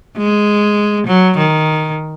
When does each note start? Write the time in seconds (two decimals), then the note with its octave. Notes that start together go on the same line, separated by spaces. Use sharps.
0.17 G#3
1.07 F#3
1.38 D#3